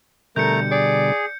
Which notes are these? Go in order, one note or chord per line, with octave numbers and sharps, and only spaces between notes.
B2 D3 G3 A3 A#4 A#5 G6 C#7
G#4 D5